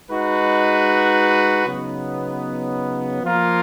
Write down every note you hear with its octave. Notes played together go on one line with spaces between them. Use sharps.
G#3 D#4 F#4 B4
C#3 F#3 B3 D#4
F3 A#3 F4 A#4